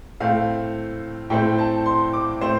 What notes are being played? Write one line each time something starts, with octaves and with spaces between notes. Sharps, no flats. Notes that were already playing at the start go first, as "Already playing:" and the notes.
A2 A3 C4 F5
A2 A3 C4 G5
A5
C6
D6
A2 A3 C4 C5